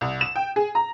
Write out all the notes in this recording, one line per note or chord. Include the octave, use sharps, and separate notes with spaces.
C2
E7
G5
G#4
A#5